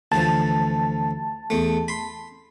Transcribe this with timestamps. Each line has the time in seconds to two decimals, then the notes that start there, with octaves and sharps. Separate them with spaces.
0.12 D2 E3 F3 A5
1.50 E2 A3
1.88 B5 C6